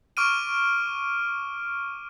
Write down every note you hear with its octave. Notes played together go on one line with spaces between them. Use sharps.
C#6 D6 F6 D7 D#7